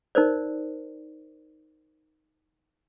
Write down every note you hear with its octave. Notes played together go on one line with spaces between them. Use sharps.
D#4 A#4 C5 D5